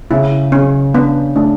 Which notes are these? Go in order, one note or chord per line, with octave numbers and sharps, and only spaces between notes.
C#3 E4
C#3 C#4
B3 D4
A3 D4